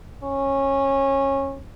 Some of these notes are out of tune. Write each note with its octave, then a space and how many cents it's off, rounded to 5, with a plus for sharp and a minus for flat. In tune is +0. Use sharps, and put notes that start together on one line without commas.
C#4 -20